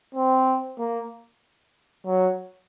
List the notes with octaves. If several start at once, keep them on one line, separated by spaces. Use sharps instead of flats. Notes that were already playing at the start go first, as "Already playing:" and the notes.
C4
A#3
F#3